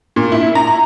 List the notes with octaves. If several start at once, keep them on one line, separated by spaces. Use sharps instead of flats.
A#2
E4
A#5